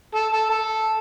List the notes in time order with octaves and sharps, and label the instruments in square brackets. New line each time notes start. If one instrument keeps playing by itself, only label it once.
[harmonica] A4
A4
A4